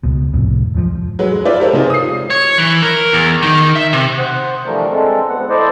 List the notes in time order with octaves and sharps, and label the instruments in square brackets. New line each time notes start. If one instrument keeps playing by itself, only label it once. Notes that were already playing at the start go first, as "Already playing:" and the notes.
[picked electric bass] C#2 B2
C2 F2 A2 C3
E2 G#2 E3 F3
[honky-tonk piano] F#3 G#3 B4
G#3
F4 B4 C5 D5 E5
G4 A4 A#4 C5 C#5
C3 G#3 D#4 F4 G#4
D#6 C7
[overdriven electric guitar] C#5
E3
A#4
E2
D#3
E5
C3
[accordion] C5 F#5 D#6 F#6
D3 E3 F3 G3 A3 A#4
D3 G#3 C4 A4
D2 B3 F#5
E4 A4 C5 D5 D#5